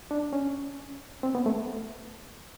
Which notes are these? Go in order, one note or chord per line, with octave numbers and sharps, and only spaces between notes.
D4
C#4
C4
B3
A3